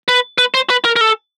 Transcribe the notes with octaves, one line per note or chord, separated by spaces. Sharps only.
B4
B4
C5
B4
A#4
A#4
A4